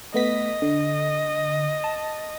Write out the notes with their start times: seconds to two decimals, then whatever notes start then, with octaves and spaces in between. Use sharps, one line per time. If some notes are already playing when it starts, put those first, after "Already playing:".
0.14 A3 B3 D#5 B6
0.62 D3
1.84 A5